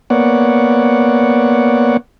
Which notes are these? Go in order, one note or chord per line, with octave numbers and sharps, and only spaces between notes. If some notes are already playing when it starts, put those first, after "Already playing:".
A#3 B3 C#5 D5 F#5